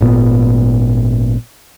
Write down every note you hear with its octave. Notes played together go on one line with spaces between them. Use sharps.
G#1 A#2 B3